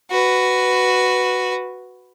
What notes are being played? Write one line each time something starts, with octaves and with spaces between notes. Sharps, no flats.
F#4 B4